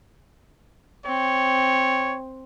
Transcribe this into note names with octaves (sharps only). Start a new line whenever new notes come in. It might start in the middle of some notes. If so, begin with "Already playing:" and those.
C4 C#5